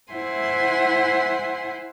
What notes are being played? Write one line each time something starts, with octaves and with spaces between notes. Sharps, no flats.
E4 C5 E5 F#5 G#5 C6